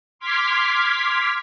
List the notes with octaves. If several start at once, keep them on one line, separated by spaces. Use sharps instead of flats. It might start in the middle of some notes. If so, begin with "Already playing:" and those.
C6 D6 F6 G#6 B6